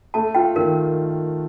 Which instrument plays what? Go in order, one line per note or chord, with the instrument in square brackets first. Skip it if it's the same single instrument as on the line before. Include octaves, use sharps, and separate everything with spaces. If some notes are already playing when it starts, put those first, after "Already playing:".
[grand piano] A3 [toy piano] A5
[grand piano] F4 [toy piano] G5
[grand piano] D#3 [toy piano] A#4